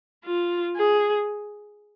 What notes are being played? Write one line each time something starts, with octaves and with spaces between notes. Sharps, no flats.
F4
G#4